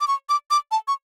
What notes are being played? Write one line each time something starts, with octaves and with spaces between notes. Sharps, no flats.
D6
C#6
D6
D6
A5
C#6